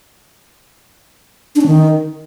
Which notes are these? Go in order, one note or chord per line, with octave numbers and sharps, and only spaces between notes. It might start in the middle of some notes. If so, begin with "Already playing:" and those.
D4
C#4
D#3